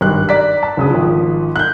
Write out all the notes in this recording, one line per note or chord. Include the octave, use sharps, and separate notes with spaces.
G#1 G2 F#6
D5 A#5 B6
A5
D2 C#3 D#6
G#1 F3
F#6 G6